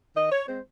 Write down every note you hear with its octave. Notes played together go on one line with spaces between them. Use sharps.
D#3 D#5
C#5
G#3 C4 C5